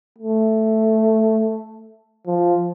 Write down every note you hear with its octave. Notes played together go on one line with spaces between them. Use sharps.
A3
F3